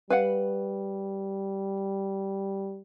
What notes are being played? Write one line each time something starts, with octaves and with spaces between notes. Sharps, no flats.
G3 B4 F5 F#5